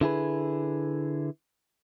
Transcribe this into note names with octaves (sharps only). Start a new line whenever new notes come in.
D3 E4 G#4 B4